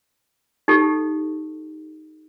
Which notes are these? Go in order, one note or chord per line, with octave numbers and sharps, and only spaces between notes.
D#4 G4 A4